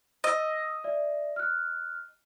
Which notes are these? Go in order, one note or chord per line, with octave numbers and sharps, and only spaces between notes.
D#5 D#6 E6
D5 E5
F6 F#6